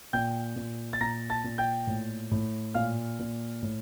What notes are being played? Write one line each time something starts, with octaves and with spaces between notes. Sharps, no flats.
A#2 G5 G6
A#2
A6
A#2 A#5 A#6
A5 A6
A#2
G5 G6
A2
A2
A#2 F5 F6
A#2
A2